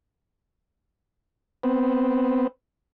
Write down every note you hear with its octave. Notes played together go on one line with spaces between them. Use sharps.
B3 C4